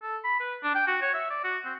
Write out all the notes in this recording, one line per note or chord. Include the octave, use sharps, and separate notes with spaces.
A4
B5
B4
D4
G5
F#4
C#5
E5
D5
F#4
C4